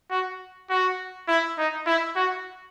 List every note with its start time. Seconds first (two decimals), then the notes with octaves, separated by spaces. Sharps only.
0.11 F#4
0.70 F#4
1.28 E4
1.58 D#4
1.87 E4
2.16 F#4